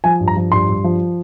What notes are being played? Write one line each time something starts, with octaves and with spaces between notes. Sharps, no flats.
F3 G#5
G2
A#5
F3
G2 C6
G2
F3